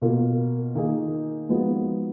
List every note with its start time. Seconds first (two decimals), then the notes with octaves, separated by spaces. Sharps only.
0.01 B2 A#3 F4 A#4
0.75 D#3 A#3 D#4 G#4
1.49 F3 G#3 B3 D#4 F#4